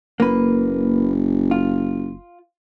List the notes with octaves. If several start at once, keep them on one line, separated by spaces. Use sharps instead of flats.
F#1 A#3 B4
F4